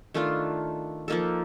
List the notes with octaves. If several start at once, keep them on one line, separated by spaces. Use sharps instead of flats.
D#3 A3 D4 F4
F3 A#3 D#4 A4